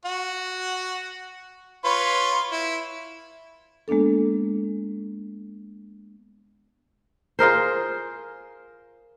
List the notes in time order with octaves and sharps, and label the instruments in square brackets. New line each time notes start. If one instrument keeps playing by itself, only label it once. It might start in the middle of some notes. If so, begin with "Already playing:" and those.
[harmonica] F#4 F#5
F4 B4 C#5
E4
[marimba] G#3 A#3 B3 D4 A4
[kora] F4 G#4 A#4 C5